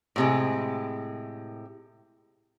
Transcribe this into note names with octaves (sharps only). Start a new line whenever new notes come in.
A2 C3 G#3